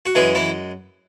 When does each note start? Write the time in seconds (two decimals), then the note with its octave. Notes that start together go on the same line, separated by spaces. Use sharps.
0.06 F#4
0.15 F#2 E3 G#3 G#4
0.35 E3 E4